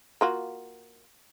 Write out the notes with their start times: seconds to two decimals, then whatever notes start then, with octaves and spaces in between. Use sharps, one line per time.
0.21 A#3 F4 F#4